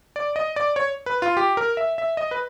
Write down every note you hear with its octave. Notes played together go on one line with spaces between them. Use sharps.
D5
D#5
D5
C#5
B4
F4
G4
A#4
E5
E5
D#5
B4